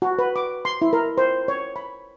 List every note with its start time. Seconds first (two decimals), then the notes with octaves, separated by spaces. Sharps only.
0.02 F#4
0.19 B4
0.36 D6
0.65 C6
0.82 E4
0.93 A#4
1.18 C5
1.48 C#5
1.76 B5